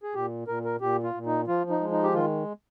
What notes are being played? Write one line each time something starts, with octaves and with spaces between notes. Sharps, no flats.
G#4
A#2 G4
A#2 A#4
A#4
A#2 G4
F4
A#2
D#4
F3 F4
D#4
G#3
D#4
G4
D#3 F4